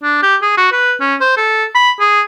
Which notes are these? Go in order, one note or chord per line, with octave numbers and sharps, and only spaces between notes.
D4
G4
G#4
F#4
B4
C#4
C5
A4
B5
G#4